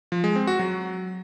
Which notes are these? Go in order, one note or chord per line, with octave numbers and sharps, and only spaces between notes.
F3
G#3
C4
F#4
F#3